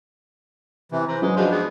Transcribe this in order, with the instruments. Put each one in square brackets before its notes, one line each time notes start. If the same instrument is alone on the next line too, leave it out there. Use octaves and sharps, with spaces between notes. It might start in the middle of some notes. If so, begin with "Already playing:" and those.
[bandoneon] C3 E3
[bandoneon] E3 [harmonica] C5 A#5
[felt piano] F#3 C#4 B4 [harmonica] G#3
[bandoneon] F3 D4 [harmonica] F4 B4 C5 [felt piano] F#4 G#4 D#5
[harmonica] G#3 B3